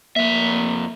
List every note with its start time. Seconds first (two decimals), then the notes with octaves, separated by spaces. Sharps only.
0.16 F2 A#3 E5